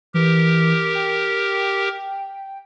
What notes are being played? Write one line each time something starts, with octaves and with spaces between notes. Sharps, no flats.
E3 G4 A#4
G5